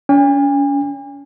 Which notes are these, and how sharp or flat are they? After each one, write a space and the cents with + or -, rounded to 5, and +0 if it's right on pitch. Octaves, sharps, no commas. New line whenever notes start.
C#4 +40 G#5 -45